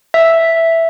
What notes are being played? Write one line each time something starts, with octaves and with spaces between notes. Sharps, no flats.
E5